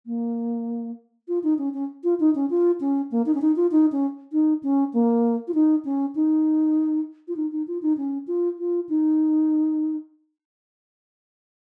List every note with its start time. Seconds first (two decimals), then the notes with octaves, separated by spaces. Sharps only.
0.06 A#3
1.28 F4
1.43 D#4
1.58 C#4
1.74 C#4
2.04 F4
2.20 D#4
2.35 C#4
2.50 F4
2.80 C#4
3.11 A#3
3.26 D#4
3.34 C#4
3.41 D#4
3.56 F4
3.72 D#4
3.92 C#4
4.32 D#4
4.63 C#4
4.93 A#3
5.48 F4
5.54 D#4
5.85 C#4
6.15 D#4
7.28 F4
7.36 D#4
7.52 D#4
7.68 F4
7.82 D#4
7.97 C#4
8.27 F4
8.59 F4
8.89 D#4